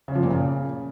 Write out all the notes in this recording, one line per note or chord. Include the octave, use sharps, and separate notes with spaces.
C#3
F3
A#2
C#3